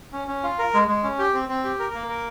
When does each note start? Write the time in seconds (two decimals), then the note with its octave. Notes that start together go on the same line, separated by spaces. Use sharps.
0.13 C#4
0.28 C#4
0.43 F4
0.59 A#4
0.74 G#3
0.88 G#3
1.03 C#4
1.18 G4
1.33 C4
1.49 C4
1.64 G4
1.79 A#4
1.94 A#3
2.09 A#4